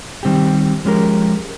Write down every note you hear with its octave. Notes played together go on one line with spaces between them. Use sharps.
D#3 G3 C4 G4
F3 G#3 C#4 G4 A#4